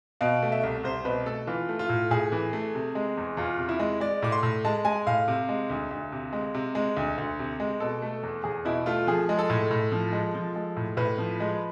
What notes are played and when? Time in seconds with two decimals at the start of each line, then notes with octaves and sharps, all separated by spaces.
0.21 B2 F5
0.43 A3
0.52 E5
0.63 C2
0.84 C2 C5
1.05 B2 B4
1.26 A3 A4
1.47 E3 F4
1.69 A3
1.79 F4
1.89 A2
2.11 A2 G#4
2.32 E3
2.53 A3
2.75 C3
2.95 G#3
3.17 E2
3.37 E2 F4
3.58 C3
3.69 E4
3.79 G#3
4.00 G#3 D5
4.22 A2 D6
4.32 C6
4.43 A2
4.65 G#3 A5
4.85 G#3 G#5
5.06 A2 F5
5.28 C3
5.49 G#3
5.70 D2
5.91 D2
6.12 C3
6.33 G#3
6.54 C3
6.75 G#3
6.97 D2
7.18 D2
7.39 C3
7.60 G#3
7.80 B2 A4
8.02 A3
8.23 E2
8.44 E2 G#4
8.65 B2 E4
8.86 A3 F4
9.07 F3 G#4
9.29 G#3
9.39 A4
9.50 A2
9.71 A2
9.92 F3
10.13 G#3
10.35 F3
10.56 G#3
10.77 A2
10.97 A2 B4
11.18 F3
11.40 G#3